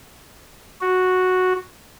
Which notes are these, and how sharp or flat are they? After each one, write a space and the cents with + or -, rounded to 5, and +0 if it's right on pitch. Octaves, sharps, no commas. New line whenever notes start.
F#4 -5